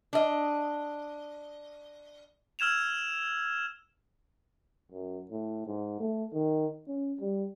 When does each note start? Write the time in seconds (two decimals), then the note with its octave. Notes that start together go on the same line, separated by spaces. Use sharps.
0.13 D4 D#5
2.59 E6 F6 G#6 E7 F7
4.92 F#2
5.31 A2
5.67 G#2
6.00 A3
6.34 D#3
6.88 C#4
7.20 G3